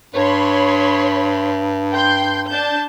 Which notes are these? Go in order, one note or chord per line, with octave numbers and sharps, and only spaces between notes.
G2 C#5 B5 C6
G5 C6 G6
D4 A5 G6